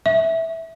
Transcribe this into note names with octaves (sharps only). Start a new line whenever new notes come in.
E5